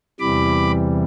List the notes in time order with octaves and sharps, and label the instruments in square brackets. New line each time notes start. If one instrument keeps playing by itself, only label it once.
[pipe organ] E2 C3 E3 G3 B5 D6